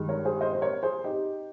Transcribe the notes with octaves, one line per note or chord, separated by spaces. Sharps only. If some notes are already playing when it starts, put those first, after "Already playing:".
Already playing: G2 D#3 G#3
A#4 C#5
G#4 C5
C5 D#5
C5
A#4 C#5
G#4 C5
D#4 G4